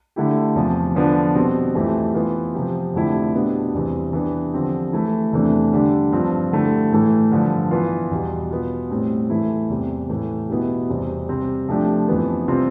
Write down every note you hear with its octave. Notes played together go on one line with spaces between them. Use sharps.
D3 A3 E4 G4
E2 C3 F3
D3 F3 B3 D4
B2 G3 C4
F2 E3 A3 E4 G4
E3 B3 F4
C3 F3 C4 G4
F2 D3 A3 E4 G4
B2 B3 D4 G4
E2 C3 E3 G3 C4
E3 B3 D4 G4
D3 F3 C4 G4
E3 A3 E4
E2 C3 E3 A3 D4
D3 G3 D4
G2 F3 C4 F4
D3 A3 E4 G4
A2 E3 A3
G2 D3 F3
E3 B3 F4
E2 B2 G3
B2 B3 F4
A2 G3 C4
A2 E3 A3 E4
E2 C3 G3
A2 E3 A3
B2 B3 E4 G4
E2 C3 G3 C4
C3 G3 C4
C3 F3 A3 D4 G4
F2 E3 B3
C3 G3 C4 F4